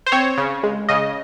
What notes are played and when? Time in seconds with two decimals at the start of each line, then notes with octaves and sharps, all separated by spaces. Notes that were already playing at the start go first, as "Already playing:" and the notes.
0.06 C5
0.12 C4 C#5
0.38 C#3
0.63 G#3
0.89 C#3 D#5